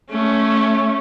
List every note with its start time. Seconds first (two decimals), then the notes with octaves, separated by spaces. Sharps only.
0.10 A3 C#4